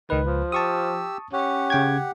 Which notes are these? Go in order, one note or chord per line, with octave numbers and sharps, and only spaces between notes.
C#2 D#3 B4
F3
G4 A5 C#6 D#6 E6
C#4 G4 F#5
C#3 G5 G#6